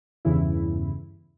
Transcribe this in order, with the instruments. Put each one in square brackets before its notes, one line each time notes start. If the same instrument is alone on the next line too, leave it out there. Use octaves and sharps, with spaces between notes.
[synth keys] E2 G2 C#3 E3 E4